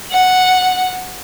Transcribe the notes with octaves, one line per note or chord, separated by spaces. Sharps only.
F#5